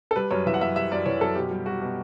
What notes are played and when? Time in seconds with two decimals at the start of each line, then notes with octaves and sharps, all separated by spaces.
0.11 A4
0.16 G3 B4
0.31 F#2 C#5
0.46 E3 E5
0.54 F#5
0.61 F#2 E5
0.76 G3 E5
0.91 F#2 D5
1.06 E3 C#5
1.21 F#2 A4
1.36 B2 G4
1.51 G3
1.66 G3 F#4
1.81 B2